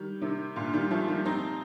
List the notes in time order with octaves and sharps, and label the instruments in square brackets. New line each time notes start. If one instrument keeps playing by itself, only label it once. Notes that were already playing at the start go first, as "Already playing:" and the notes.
Already playing: [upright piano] D#3 G3
C3 D#3
A#2 D3
D#3 G3
F3 A3
D#3 G3
C4 D#4